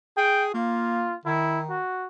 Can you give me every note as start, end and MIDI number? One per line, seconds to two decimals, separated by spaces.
0.17 0.52 68
0.17 0.43 79
0.54 1.13 58
0.54 1.15 65
1.26 1.78 51
1.26 1.59 64
1.69 2.08 66